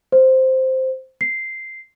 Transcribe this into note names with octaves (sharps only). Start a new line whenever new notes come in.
C5
C7